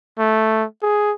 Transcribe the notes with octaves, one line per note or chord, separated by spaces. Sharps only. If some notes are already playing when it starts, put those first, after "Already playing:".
A3
G#4